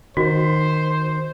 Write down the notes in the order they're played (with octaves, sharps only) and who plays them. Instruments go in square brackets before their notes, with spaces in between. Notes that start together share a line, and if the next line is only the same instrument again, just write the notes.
[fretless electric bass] D#3 [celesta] F#4 [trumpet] C5